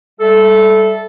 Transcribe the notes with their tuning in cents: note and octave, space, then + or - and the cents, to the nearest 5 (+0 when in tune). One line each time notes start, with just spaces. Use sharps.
G3 +20 A4 -15 E5 +0